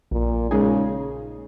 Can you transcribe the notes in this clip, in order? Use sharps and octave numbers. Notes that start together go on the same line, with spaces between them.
A#1 A#2
A#2 C#3 G#3 D#4 G#4